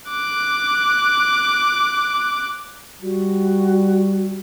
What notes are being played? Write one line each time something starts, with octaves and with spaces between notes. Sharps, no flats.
D6 F#6
G3 F#4